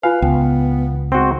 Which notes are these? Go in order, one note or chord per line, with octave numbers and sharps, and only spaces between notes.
F4 B4 F5 G#5
C#2 B3 G5
G#3 C4 F#4 C#6